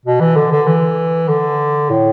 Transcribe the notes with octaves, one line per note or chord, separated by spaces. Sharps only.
B2
E3
D3
D3
E3
D3
A2